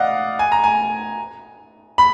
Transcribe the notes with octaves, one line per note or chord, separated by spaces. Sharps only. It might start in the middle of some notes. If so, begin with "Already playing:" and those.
Already playing: D5 D#5 F5 F#5
G#5
A#5
G#5
B5